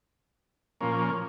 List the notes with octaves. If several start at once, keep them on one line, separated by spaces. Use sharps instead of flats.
A#2 F3 A#3 C#4